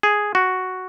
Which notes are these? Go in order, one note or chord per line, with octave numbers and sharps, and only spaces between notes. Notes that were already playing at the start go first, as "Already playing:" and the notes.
G#4
F#4